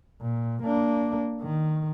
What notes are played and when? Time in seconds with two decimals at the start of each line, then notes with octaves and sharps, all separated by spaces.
0.21 A#2
0.63 A#3 D4
1.41 D#3